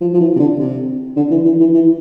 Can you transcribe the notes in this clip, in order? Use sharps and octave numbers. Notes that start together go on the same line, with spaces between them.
F3
F3
E3
C3
D3
C3
D3
E3
E3
E3
E3